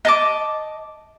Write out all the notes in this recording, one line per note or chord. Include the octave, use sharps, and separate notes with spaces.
D#5 A5 D6